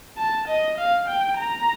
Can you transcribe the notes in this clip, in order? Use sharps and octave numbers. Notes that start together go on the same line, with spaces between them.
A5
D#5
F5
G5
A#5